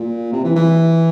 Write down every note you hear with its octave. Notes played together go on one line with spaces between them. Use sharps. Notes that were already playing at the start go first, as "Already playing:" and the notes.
Already playing: A#2
C3
E3
E3